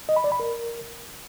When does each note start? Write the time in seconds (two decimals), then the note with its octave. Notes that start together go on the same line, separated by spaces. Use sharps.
0.09 D#5
0.16 B5
0.24 D5
0.32 B5
0.40 A#4